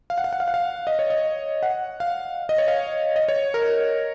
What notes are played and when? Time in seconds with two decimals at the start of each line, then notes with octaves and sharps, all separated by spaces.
0.10 F5
0.18 F#5
0.24 F5
0.33 F#5
0.40 F5
0.48 F#5
0.54 F5
0.87 D#5
0.99 C#5
1.10 D#5
1.63 F#5
2.00 F5
2.49 D#5
2.58 C#5
2.68 F5
3.16 D#5
3.29 C#5
3.54 A#4